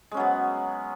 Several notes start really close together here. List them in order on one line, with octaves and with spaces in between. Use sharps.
G#3 C#4 F#3 B3